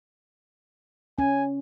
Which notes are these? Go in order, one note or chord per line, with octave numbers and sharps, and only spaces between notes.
C#4 G#5